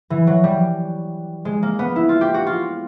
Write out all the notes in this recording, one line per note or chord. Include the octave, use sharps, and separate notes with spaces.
E3
F#3
G3
G#3
A#3
B3
E4
F4
G4
F#4
F4